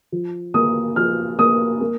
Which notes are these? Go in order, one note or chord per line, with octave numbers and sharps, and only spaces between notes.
F3
A#3 D#6
F3 F6
A#3 D#6
A#3